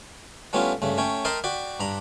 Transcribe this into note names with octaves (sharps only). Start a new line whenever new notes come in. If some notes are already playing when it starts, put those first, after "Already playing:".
G3 A3 B3 C#4 E4 F4
G2 C#3 A3
A3 C#4 C#5 G5
A#4 D#5 G5 A5 B5 C6
F#4 D5 G5 B5
G2 D4 A#5 B5